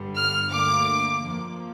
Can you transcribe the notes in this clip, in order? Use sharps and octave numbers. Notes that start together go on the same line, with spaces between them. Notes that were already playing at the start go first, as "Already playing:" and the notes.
Already playing: G1 G2 D3 G3
F6
D2 D3 A#3 D6
F2 F3 A#3